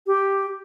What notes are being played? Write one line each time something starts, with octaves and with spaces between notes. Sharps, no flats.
G4